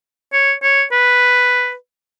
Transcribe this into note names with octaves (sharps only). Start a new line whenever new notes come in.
C#5
C#5
B4